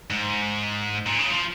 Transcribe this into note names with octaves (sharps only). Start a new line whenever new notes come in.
G#2
A#2
C#3
F3